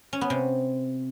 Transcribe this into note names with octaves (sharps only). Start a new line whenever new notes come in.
C#4
B3
C3